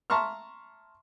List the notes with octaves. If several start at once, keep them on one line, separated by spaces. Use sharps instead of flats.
E5 A5 A#5 C6 C#6 F6